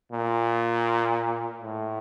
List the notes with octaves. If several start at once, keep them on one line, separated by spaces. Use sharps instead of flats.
A#2
A2